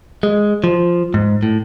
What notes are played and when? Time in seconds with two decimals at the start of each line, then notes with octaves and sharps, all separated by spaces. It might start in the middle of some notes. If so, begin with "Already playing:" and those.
0.23 G#3
0.64 F3
1.14 G#2
1.43 A2